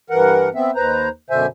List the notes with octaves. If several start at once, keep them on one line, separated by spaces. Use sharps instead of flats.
G2 E3 A#4 F#5
B3 C4 E5
D#2 B4 C5 A#5
F#2 B2 D3 C5 E5 G#5